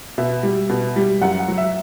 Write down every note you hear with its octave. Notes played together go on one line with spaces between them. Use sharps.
B2 E5
G3
B2
G3
F#2 F#5
F#5
F#3
E5